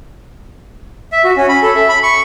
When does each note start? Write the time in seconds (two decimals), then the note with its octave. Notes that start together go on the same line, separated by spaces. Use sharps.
1.12 E5
1.24 F#4
1.37 C#4
1.49 B5
1.62 A4
1.75 E5
1.89 B5
2.03 C#6